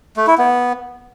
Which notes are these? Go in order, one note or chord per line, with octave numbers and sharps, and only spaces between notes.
A3
E4
B3